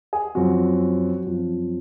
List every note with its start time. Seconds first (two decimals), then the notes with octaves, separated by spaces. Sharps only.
0.13 G#4
0.35 F#2 F3 C4 F#4
1.26 F#2 F3 C4